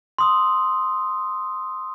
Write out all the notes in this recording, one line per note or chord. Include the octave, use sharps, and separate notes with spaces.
C6 D#6 E6